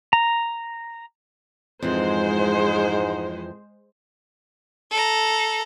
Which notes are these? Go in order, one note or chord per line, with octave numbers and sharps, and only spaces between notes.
A#5
F2 G#2 E3 G#3 C5
A4 A#5